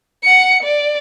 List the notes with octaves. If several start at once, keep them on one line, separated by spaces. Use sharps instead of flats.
F#5 C#7
D5